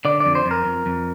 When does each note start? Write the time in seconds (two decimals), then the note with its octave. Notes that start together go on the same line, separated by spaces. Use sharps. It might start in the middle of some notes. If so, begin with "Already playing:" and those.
0.05 D3 D5
0.20 F2 D5
0.35 C5
0.46 F2
0.51 A#4
0.66 F2
0.86 F2